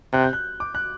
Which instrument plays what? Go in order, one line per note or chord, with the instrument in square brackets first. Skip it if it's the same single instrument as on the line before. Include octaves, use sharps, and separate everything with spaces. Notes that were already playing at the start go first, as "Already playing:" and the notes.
[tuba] C3 [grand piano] F#6
[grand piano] G6
F#6
D6
F#6